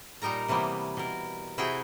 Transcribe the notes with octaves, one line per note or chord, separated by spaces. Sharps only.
A#2 G3 D#4 A#4 A#5
C3 E3 G3 A#3 B3
B2 A#4
C3 E4 F#4 G#4 G5